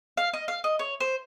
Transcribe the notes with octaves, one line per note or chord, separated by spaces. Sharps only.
F5
D#5
F5
D#5
C#5
C5